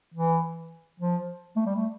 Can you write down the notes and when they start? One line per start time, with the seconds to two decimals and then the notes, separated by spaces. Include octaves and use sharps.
0.14 E3
1.00 F3
1.56 A3
1.66 G3
1.75 A3